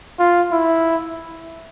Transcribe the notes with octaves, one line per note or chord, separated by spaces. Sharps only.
F4
E4